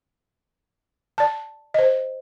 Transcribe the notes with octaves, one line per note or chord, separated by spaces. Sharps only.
D5 A5
C5 D#5